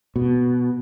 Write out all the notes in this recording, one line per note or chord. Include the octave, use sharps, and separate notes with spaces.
B2